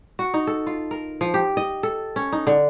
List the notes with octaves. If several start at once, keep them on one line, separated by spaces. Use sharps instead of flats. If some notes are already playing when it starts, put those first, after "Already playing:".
F#4
D#4
A4
F4
A#4
F3
G4
D#5
A4
C#4
D#4
D3